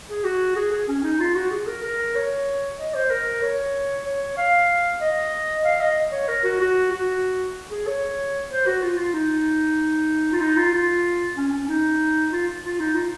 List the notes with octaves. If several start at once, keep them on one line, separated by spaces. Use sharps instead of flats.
G#4
F#4
G#4
G#4
C#4
D#4
F4
F#4
G#4
A#4
A#4
C#5
D#5
C5
A#4
C#5
C#5
F5
D#5
F5
D#5
C#5
A#4
F#4
F#4
F#4
G#4
C#5
C5
F#4
F4
F4
D#4
F4
D#4
F4
F4
C#4
C#4
D#4
F4
F4
D#4
F4